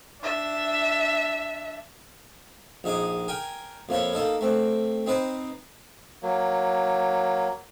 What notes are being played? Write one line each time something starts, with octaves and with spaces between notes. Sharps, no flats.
D4 E5
A#1 D#4 G#4 D6 D#6
A#4 G5 G#5
F2 A#3 E4 C#5
A#3 D#4 A4
A3 C4
C4 D#4 B4 C5
F#3 A#3